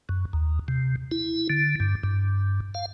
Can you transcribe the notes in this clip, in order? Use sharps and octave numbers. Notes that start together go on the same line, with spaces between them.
F#2
D#2
C3
E4
D3
G2
G2
F5